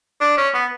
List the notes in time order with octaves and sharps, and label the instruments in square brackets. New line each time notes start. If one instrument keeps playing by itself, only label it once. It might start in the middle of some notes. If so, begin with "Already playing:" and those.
[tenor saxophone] D4
C#4
B3